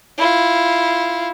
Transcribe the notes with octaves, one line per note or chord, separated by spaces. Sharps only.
E4 F4